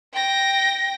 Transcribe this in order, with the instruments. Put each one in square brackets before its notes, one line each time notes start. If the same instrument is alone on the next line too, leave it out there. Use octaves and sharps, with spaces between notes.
[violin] G5 A#6